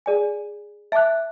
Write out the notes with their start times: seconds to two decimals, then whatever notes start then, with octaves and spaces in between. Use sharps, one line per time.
0.06 G#4 D5 G#5
0.92 E5 A5 D6 F#6